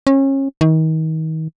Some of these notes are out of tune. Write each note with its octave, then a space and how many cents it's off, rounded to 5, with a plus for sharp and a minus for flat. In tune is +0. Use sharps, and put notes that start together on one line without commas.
C#4 -30
D#3 +35